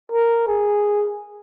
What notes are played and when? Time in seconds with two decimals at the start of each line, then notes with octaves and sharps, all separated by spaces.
0.12 A#4
0.48 G#4